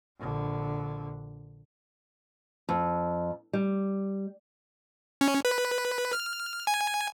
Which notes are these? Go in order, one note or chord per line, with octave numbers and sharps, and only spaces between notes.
A#1 D3
F2
G3
C#4
B4
F6
G#5